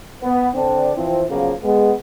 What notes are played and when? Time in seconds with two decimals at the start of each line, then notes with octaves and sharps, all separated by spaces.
0.23 B3
0.55 D3 C4 D4
0.96 E3 F3 C4
1.30 F#2 C#3 F3 A#3 B3
1.63 G#3 B3